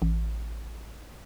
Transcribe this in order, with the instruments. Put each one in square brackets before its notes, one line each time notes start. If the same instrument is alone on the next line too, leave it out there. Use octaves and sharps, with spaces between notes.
[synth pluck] A1